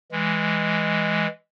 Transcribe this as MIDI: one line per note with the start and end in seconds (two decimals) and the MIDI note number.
0.12 1.27 52
0.12 1.27 56